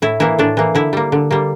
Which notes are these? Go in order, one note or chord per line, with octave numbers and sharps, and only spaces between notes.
A2 E4
E3 A#3 E4
A2 D4
E3 A#3
D3 E4
G3 A#3
D3
G3 A#3